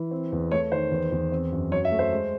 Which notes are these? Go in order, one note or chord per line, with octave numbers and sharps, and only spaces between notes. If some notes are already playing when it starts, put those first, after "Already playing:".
Already playing: E3
C4
E2
A3 C#5
D#3 C5
E2
E2
C4
F#2
F#3 C#5
E5
A3
C5
G#3